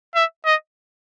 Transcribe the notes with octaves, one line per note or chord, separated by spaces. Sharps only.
E5
D#5